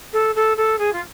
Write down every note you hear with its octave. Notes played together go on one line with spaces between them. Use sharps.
A4
A4
A4
G#4
F4